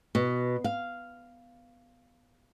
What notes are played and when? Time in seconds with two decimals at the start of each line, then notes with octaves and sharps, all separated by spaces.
0.15 B2
0.64 F5